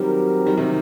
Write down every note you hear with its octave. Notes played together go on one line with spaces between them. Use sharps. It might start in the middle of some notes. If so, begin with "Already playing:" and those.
Already playing: D#3 F#3 G3 C4 G4 A#4
D#3 G3
C3 D#3